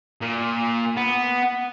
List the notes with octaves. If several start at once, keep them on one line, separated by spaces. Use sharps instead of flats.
A#2
B3